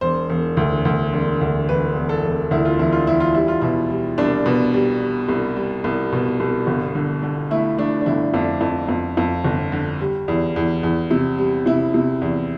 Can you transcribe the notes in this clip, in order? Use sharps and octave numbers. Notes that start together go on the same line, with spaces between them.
E1 C5
E1
D2
D2
E1
D2
E1 B4
E1
A4
E1
D2 E4
F4
E1 E4
F4
E1 E4
F4
G3 E4
F4
B2 E4
G3
C2 D4
B2
G3
G3
C2
G3
C2
B2
C2
G1
D3
D3
A3 E4
A3 D4
D4
G1 E4
F2 D4
F2
F2
F2
G1
D3
G3
E2
E2
E2
C3
G3
C3 E4
C3
E2